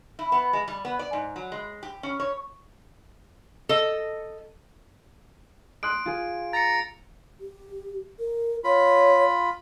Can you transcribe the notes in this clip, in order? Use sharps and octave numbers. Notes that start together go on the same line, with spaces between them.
E4
B3
G#3
G3
B3
D5
G#2
F#3
G#3
G4
C#4
C#5
A4 D#5
C6 D#6 F#6 D7
F4 G#4
A#5 A6 C#7
G4
A#4
F4 C#5 B5